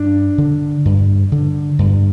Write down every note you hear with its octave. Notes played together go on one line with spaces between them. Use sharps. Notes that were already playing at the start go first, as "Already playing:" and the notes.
Already playing: G2 D4
D3
G2
D3
G2